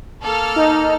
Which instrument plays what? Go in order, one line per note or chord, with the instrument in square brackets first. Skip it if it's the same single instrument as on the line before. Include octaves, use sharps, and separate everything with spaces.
[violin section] A#3 A4 F6
[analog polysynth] D#4